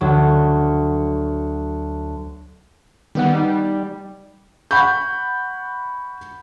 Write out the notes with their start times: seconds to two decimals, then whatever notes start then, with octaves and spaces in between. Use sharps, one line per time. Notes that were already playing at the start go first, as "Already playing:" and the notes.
0.01 D2 F#3
3.15 D#3 G3 B3 F#5
3.34 D#4
4.71 F#5 B5 C#6 G6